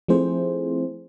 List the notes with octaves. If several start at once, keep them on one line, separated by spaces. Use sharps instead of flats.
F3 A3 C4 E4 G#4 C5